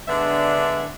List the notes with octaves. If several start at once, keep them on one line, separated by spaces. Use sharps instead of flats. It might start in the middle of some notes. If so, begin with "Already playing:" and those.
D3 G#3 B3 D4 D5 E5